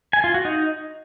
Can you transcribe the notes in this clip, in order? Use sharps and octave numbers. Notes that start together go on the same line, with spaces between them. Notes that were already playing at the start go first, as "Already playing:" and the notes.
G#5
F4
F#4
D#4